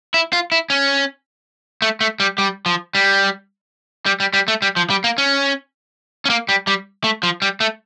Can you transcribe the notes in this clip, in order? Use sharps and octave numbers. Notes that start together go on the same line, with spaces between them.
E4
F4
E4
C#4
A3
A3
G3
G3
F3
G3
G3
G3
G3
A3
G3
F3
G3
A#3
C#4
C#4
A#3
G3
G3
A3
F3
G3
A3